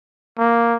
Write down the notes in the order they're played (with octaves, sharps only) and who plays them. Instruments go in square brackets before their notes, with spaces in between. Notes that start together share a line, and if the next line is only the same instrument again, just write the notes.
[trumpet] A#3